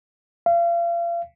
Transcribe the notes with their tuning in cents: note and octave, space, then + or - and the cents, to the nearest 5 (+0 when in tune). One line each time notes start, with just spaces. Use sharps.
F5 -35